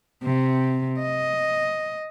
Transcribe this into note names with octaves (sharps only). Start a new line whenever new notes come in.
C3
D#5